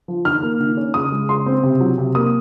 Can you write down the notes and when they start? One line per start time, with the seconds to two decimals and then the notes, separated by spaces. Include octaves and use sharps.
0.08 F3
0.25 D#3 F6
0.43 A#3
0.60 D#3
0.77 C#4
0.94 C#3 D#6
1.12 G#3
1.29 C#3 C6
1.46 C4
1.63 C3
1.81 F#3
1.98 C3
2.15 A#3 D#6